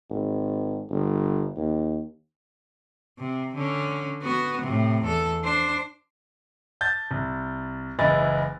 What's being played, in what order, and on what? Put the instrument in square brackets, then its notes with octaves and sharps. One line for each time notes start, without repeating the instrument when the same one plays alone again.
[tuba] G#1
G1
D#2
[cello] C3
D3 C#4
B3 F#4
A2 C3
E2 A4
D4 C5
[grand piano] A5 G6 A6
C2
F#1 C#2 E3 E4 D#5 A6